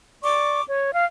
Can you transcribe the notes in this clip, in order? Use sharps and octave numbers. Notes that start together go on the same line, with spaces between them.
D5 C#6 D6
C#5
F5